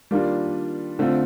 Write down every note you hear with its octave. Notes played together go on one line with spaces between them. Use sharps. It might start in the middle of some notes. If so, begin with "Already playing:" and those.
D#3 G3 A#3 D4 F4
D3 A3 C4 F4